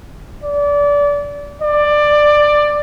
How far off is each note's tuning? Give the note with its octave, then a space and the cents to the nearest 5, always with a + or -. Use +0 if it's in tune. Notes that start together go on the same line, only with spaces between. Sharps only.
D5 -25
D5 +15